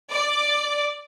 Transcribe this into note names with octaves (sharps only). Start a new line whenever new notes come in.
D5